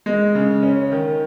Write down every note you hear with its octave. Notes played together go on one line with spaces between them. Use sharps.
G#3
C#3
C#4
D#3